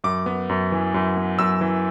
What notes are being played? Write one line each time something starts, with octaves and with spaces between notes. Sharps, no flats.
F#2 D6
B3
F#2
E3
F#2
B3
F#2 E6
E3